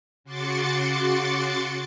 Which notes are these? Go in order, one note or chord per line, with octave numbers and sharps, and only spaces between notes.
C#3 F#4 C6 D6 A6 C#7